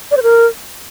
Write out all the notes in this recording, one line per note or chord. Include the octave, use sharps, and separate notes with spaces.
D5
C5
A#4